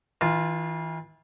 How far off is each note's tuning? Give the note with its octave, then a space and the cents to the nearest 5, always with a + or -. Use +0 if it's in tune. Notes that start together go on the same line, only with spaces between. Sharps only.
E3 -35 F4 +0 A5 -20